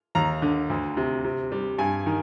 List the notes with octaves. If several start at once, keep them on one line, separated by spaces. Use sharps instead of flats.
D#2 A#5
D3
D2
C3
C3
G3
G2 G#5
D#3